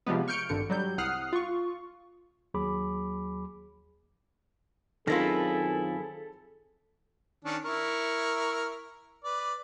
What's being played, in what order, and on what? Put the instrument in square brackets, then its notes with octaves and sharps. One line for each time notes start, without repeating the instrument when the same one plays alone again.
[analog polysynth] C3 F3 G3 G#3 B3
C#6 F6 G6 C#7 D7
G#1 G2 D3 C#7
F#3 G3 G6
C2 F#5 D#6 F6 F#6 C7
F4 C#6
[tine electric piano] D#2 F#3 G#4 B5 D6
[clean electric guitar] F#2 E4 [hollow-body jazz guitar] D#3 C4 F4 [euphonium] G#4 [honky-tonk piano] A4 A#6
[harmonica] D#3 C#4 D4
E4 A#4 C#6
B4 D5